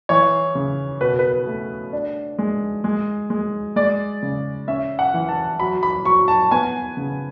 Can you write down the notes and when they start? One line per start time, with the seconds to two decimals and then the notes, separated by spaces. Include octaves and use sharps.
0.09 E3 C#5
0.55 C#3
1.01 B2 B4
1.19 B4
1.47 A3
1.93 D4
2.39 G#3
2.84 G#3
3.30 G#3
3.76 G#3 D5
4.22 C#3
4.68 C#4 E5
4.99 F#5
5.14 E3
5.29 A5
5.60 F#3 B5
5.83 B5
6.05 F#3 C#6
6.28 A5
6.51 B3 G#5
6.97 C#3